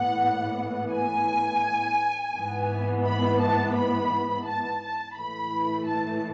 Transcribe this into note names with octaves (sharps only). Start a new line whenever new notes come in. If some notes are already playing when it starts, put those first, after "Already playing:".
Already playing: A2 E3 B3 F#5
G#5
G#2 E3 B3
B5
A5
B5
A5
A5
A2 E3 A3 B5
A5